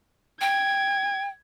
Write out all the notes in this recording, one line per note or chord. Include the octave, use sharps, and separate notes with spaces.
G5 G#6